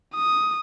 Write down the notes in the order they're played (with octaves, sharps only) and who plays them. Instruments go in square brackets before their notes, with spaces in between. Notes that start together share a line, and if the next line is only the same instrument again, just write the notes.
[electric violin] D#6